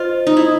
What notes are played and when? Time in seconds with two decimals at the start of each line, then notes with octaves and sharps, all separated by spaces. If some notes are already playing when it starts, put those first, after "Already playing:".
Already playing: F4 C5 D#5
0.27 D#4
0.37 E4